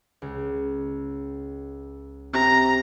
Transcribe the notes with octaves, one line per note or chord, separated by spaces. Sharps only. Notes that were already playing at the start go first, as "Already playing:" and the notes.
C#2
C3 A#5